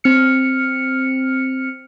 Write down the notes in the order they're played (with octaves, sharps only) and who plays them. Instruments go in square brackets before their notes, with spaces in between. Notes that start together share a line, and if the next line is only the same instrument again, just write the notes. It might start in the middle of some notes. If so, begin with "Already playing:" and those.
[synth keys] C4 F6 C#7